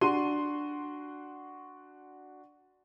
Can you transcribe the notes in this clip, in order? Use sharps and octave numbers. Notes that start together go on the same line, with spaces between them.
D4 F#4 C6 D#7